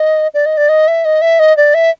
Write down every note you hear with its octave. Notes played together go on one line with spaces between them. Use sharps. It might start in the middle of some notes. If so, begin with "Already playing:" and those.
Already playing: D#5
D5
D#5
D5
D#5
E5
D#5
E5
D#5
D5
E5